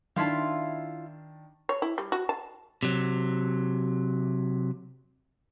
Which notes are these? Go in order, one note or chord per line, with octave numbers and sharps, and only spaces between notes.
D#3 D4 E4 F4 F5 A5
C#5
E4
G3
F#4
A5
C3 F#3